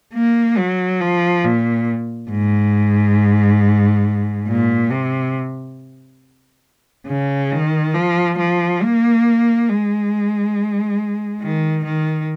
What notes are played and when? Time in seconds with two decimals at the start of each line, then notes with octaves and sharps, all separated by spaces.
0.14 A#3
0.57 F#3
1.01 F3
1.44 A#2
2.30 G#2
4.48 A#2
4.90 C3
7.07 C#3
7.52 D#3
7.94 F3
8.38 F3
8.82 A#3
9.69 G#3
11.42 D#3
11.85 D#3